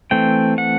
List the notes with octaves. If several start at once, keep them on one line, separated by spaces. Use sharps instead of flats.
E3 A3 C4 G5
F#5